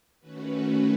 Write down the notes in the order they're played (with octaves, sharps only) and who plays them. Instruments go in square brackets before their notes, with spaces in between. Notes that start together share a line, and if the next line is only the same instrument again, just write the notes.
[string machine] D#3 A3 C#4 F#4 B4